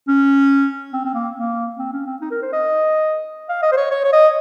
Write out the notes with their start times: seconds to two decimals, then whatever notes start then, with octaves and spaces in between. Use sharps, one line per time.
0.08 C#4
0.93 C4
1.06 C4
1.14 A#3
1.36 A#3
1.79 C4
1.93 C#4
2.06 C4
2.21 D#4
2.31 A#4
2.42 C5
2.53 D#5
3.49 F5
3.62 D#5
3.72 C5
3.77 C#5
3.91 C#5
4.04 C#5
4.13 D#5